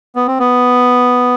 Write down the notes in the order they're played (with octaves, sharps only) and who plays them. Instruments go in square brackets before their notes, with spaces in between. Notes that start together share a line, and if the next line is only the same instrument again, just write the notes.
[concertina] B3
C4
B3